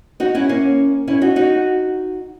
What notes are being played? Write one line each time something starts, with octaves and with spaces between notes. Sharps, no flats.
D#4 F#4
C#4 E4
A#3 C#4
C#4 E4
D#4 F#4
D#4 F#4